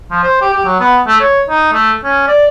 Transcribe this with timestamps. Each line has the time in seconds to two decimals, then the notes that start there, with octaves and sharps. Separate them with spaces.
0.11 F3
0.23 C5
0.41 G4
0.53 G4
0.65 F#3
0.80 B3
1.07 A3
1.20 C#5
1.49 D#4
1.73 A3
2.04 C#4
2.27 D5